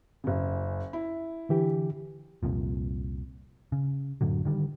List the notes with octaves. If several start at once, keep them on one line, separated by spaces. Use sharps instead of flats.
F#1 C#3
E4
D3 E3 G4
C2 F2 A#2
C#3
F#2 A2 D3 F#3
D3 D#3 G3